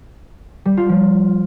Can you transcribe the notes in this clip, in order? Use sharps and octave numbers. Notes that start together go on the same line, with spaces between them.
G3
F4
F3